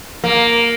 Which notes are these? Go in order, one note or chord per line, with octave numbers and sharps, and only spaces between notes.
A#3